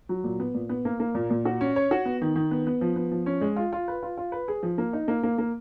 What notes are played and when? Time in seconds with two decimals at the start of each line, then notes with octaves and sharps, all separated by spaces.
0.09 F#3
0.24 A#2
0.40 B3
0.54 A#2
0.69 B3
0.85 A#3
1.00 A#3
1.15 A#2
1.30 A#2
1.45 F#4
1.61 C#4
1.76 C#5
1.91 F#4
2.05 B3
2.22 D#3
2.36 D#3
2.51 B3
2.67 B3
2.81 F3
2.96 B3
3.12 F3
3.26 C#4
3.41 G#3
3.56 F4
3.73 F4
3.88 B4
4.03 F4
4.18 F4
4.32 B4
4.48 G#4
4.63 F3
4.78 A#3
4.93 D#4
5.08 A#3
5.23 A#3
5.38 A#3